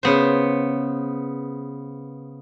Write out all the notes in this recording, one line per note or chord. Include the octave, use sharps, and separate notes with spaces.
C#3 B3 C5